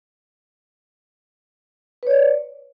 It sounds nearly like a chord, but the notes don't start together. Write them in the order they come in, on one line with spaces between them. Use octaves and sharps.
B4 C#5 D5